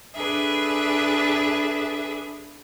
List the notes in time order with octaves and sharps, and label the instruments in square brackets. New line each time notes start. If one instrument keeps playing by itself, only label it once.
[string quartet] D4 G#4 A4 B4 E5